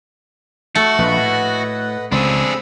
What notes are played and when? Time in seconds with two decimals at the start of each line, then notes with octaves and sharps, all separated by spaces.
0.75 A3 F#4
0.99 A#1 B4 D#5 F#5
1.17 A2
2.12 C#2 C4 D4 G#4 B5 E6